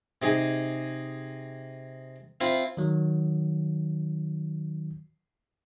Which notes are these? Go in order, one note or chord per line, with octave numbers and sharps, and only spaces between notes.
C3 D#4 G#4
C4 E4 F4
D#3 F#3